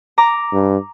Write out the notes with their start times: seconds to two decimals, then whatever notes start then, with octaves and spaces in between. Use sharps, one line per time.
0.18 A#5 D6
0.53 G2